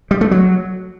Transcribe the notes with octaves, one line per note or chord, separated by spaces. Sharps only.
G3
A3
F#3